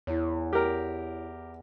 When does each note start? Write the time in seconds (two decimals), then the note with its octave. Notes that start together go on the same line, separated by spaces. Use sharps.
0.07 E2 E4 C#5
0.53 G4 A#4